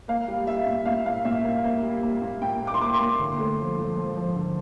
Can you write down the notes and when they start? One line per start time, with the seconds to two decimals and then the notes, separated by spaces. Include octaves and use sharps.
0.08 A#3 F5
0.28 G3
0.47 A#3 E5
0.66 A#2
0.86 A#2 F5
1.05 A#3 F5
1.25 A#2 E5
1.44 A#3
1.64 A#3
1.83 G3
2.02 A#3
2.22 A#2
2.42 A#2 G5
2.61 A#3
2.67 D6
2.74 C6
2.81 A#3 D6
2.93 C6
3.00 A#3
3.19 D3
3.39 A3
3.58 F3
3.77 F3
3.96 F3
4.16 F3
4.36 D3